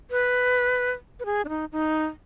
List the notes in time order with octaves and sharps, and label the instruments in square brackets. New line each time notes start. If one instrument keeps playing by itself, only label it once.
[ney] B4
B4
G#4
D4
D#4
D#4